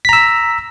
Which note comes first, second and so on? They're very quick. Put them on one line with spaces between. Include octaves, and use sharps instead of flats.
B6 A#5 E6